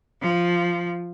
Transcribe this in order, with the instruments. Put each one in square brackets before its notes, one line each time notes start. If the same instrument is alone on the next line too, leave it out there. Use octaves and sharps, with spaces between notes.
[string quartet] F3